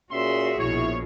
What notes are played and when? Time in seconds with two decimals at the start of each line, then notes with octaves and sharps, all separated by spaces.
0.12 A#2 C#4 F#4 G#4 E5 C6
0.59 A#1 B2 E4 C#5